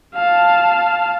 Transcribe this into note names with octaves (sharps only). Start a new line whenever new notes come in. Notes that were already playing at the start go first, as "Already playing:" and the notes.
F5 A5